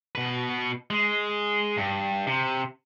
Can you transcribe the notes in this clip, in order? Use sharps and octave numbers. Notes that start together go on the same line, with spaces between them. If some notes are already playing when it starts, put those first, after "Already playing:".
B2 B4
G#3
G2
C3